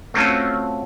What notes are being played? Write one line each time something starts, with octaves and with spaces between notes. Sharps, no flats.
A3 C4 C#4 F4 F#4